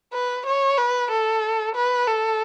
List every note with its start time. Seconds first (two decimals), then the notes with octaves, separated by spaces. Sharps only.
0.13 B4
0.47 C#5
0.78 B4
1.11 A4
1.75 B4
2.07 A4